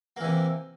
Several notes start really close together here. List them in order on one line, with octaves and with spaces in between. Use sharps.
A#3 E3 C3